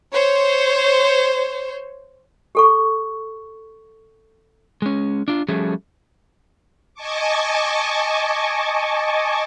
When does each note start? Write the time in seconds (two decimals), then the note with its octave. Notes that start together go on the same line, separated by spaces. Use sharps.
0.11 C5 C#5
2.55 G4 A4 C#6
4.82 G#3 C#4
5.28 D4 F4
5.49 F3 G3 A3 C#4 F#4 G#4
6.94 D#5 G#5 A5 C#6 D6